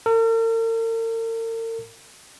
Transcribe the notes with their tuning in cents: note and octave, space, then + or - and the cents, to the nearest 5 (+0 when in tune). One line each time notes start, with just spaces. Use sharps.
A#4 -45